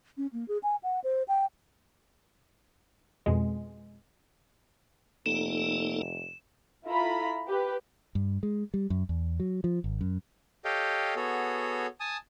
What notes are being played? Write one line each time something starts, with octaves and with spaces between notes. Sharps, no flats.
C#4
A#3
G#4
G#5
F#5
C5
G5
F2 B2 G#3
F1 A#3 D#4 A4 E7
E4 F4 A4 A#5 B5
G4 B4
G2
G#3
G3
F#2
E2
F#3
F3
G#1
F#2
G4 A4 C#5 D#5 F5 G5
B3 F#4 G#4 A4 C#5
G#5 A5 D#6